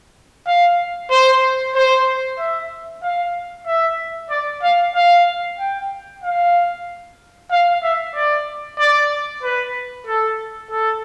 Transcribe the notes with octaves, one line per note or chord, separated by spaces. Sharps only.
F5
C5
C5
E5
F5
E5
D5
F5
F5
G5
F5
F5
E5
D5
D5
B4
A4
A4